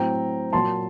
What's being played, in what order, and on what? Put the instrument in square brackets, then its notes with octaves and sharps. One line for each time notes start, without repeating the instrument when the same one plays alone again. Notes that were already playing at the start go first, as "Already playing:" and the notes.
Already playing: [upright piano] A2 F#3 C4 G5 A#5
A#2 F#3 A#3 A5 C6